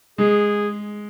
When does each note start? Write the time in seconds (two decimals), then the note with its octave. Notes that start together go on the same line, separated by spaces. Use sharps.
0.18 G#3 G#4